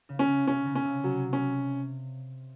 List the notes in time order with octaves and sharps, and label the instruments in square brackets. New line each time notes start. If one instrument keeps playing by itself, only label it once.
[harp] C#3
[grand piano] C#4
[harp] C#3
[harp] C3 [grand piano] C#4
[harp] C#3
[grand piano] C#4
[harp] C3
[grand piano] F#3
C#4